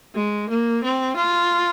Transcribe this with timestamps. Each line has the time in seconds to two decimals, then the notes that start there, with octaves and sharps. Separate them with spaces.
0.15 G#3
0.49 A#3
0.83 C4
1.16 F4